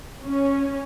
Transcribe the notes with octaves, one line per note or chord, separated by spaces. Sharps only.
C#4